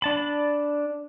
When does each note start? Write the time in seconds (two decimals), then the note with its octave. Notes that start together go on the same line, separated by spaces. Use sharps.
0.02 D4 A5 B5